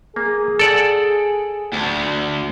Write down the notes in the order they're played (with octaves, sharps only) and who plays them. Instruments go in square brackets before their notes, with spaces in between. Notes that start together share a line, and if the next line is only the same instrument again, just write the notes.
[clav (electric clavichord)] A#3 [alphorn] G#4
[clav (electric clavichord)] A4 D5 F#5
[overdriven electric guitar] D2